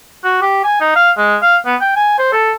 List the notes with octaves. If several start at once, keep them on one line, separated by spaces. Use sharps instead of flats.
F#4
G4
G#5
D#4
F5
G#3
F5
B3
G5
G#5
C5
A4